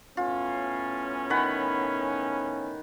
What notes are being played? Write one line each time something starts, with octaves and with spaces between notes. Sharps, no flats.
A2 B3 C#4 F4
D#3 F#5 B5